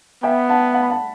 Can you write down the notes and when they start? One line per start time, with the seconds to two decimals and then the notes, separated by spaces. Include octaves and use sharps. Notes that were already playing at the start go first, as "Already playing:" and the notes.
0.23 B3 E5 G5
0.49 F#5 A5
0.74 F#5 A5
0.83 B5
0.90 F#5 A5